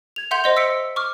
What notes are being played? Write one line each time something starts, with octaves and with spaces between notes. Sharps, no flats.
G#6 F7
E5 F#5 C6 G6 F7
C5 D#5 C6
E6 B6 C#7 D7
C#6 D6 F6